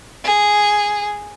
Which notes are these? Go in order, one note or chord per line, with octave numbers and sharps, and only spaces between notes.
G#4